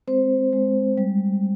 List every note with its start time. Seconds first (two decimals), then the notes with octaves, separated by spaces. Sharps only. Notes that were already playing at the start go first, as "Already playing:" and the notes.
0.07 G#3 C4 C5
0.53 G#3
0.97 G3